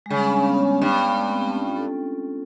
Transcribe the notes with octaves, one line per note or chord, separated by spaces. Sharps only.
G#3
C#3 G3
C#4
D4
C#4
B3
G2
G#3
A3
C4
C4
C#4
F4
A4